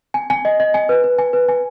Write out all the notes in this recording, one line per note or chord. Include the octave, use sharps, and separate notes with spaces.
G#5
G#5
D#5
D#5
G#5
B4
B4
G#5
B4
G#5